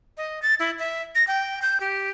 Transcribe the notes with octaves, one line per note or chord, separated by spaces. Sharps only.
D#5
A6
E4
E5
A#6
G5
G6
G4